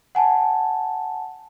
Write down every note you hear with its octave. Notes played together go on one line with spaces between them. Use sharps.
F#5 G#5 A5